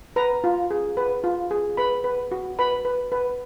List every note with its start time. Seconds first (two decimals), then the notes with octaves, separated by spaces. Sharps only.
0.16 B4 A#5
0.44 F4
0.71 G#4
0.97 B4
1.24 F4
1.51 G#4
1.77 B4 B5
2.04 B4
2.32 F#4
2.59 B4 B5
2.85 B4
3.12 B4